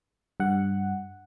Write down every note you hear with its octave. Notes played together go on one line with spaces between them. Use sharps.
G2 F#5